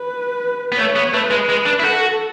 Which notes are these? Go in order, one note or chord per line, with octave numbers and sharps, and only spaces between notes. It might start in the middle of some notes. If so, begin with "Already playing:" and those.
Already playing: B4
B3
A3 C#5
B3
A3 B4
G#3
G#3
D4
E4
F#4 A4